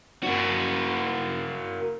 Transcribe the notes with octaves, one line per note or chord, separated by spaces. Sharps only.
A#3 F#4